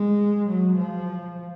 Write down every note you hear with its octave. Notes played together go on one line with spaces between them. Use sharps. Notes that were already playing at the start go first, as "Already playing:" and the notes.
Already playing: G#3
F#3
F3